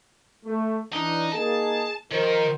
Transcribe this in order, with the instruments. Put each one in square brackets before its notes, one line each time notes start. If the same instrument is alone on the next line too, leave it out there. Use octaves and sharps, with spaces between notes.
[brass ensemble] A3
[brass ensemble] E3 D4 [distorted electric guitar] D#4
[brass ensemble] A#3 D#4 G#4 [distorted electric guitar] A5
[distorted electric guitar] D#3 [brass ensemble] F3 A#4 C5